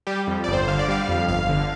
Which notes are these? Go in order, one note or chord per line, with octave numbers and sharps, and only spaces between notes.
G3 G4
F2
D5
G1
C5
D3 F5
D5
G3 F5
F2
G1 F5
D3